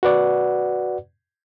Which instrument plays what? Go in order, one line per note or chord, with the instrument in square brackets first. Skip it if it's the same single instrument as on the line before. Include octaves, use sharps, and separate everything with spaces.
[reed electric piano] F#4 B4 D5 F#5